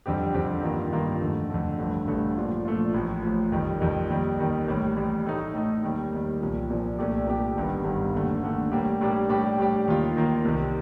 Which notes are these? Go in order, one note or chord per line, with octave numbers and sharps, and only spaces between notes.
F2 D3 G3 C4 G4
F2 D3 G3 C4 G4
G2 D#3 A#3 F4
G2 D#3 A#3 F4
F2 D3 A3
F2 D3 A3
A1 G2 D3 A3
A1 G2 D3 A3
A#2 F3 A3 D4 F4
A#2 F3 A3 D4 F4
A1 A2 F3
A1 A2 F3
F2 D#3 G3
F2 D#3 G3
D#2 D#3 G3
D#2 D#3 G3
A1 A2 G3
A1 A2 G3
A2 A3 D#4
A2 A3 D#4
D#2 D#3 G3
D#2 D#3 G3
C2 A#2 F3
C2 A#2 F3
C2 A#2 A3 D4 G4
C2 A#2 A3 D4 G4
G1 G2 D#3 G3
G1 G2 D#3 G3
D#2 D3 A3
D#2 D3 A3
A2 G3 A#3 D4 G4
A2 G3 A#3 D4 G4
A2 G3 D4 G4
A2 G3 D4 G4
D#2 D#3 A#3 F4
D#2 D#3 A#3 F4
C2 C3 D#3